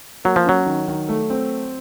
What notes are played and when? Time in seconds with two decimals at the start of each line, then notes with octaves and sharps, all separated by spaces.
0.25 F#3 A#3
0.36 F3
0.46 F#3 C#4
0.66 D#3
0.88 D#3
1.09 A3
1.30 C4